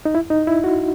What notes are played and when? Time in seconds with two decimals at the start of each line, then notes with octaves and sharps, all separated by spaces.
0.05 D#4
0.15 E4
0.30 D#4
0.47 E4
0.64 F#4